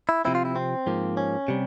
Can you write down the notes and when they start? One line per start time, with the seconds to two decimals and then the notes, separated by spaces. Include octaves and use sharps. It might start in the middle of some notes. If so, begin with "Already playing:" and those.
0.09 E4
0.25 C3 F3 C4 E4
0.35 F4
0.45 E4
0.56 C4
0.86 G#2 F3 A#3
1.17 C#4
1.48 C3 G3